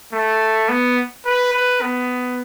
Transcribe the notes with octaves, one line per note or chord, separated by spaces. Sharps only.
A3
B3
B4
B4
B3